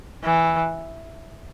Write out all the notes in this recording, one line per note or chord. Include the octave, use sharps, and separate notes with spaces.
E3